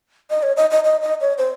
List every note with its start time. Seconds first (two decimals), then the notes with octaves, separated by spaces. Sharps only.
0.30 D#5
0.43 C#5
0.57 D#5
0.71 D#5
0.84 D#5
1.02 D#5
1.21 C#5
1.38 C5